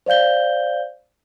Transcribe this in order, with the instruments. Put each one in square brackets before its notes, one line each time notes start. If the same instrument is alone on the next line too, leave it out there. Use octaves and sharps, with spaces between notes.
[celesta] C5 D5 F5 G6 G7